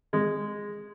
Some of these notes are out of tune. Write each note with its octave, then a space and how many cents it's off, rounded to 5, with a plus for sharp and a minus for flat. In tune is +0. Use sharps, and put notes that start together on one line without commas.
G#3 -5